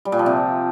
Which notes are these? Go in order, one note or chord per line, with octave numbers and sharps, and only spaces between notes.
G3
A#2
F3
C3